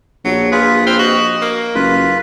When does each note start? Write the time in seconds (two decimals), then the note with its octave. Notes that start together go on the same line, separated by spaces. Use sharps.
0.25 A#1 F#3
0.52 F4 G#4 B4
0.86 C4 F4 F6
0.99 F#4 D#5
1.42 A#3
1.75 F#1 F4 B4